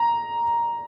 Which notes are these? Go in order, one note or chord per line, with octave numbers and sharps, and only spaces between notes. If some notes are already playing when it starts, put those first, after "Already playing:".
Already playing: A#5